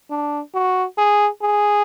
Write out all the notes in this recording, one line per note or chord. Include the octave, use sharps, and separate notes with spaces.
D4
F#4
G#4
G#4